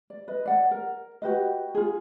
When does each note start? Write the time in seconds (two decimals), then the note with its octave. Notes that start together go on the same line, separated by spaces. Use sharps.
0.10 D5
0.28 B4 D#5
0.46 D5 F#5
0.71 A#4
1.22 F#4 G4 B4 D#5
1.75 F4 G#4